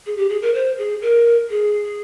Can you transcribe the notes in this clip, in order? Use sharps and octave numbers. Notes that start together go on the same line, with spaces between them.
G#4
G4
G#4
A#4
C5
G#4
A#4
G#4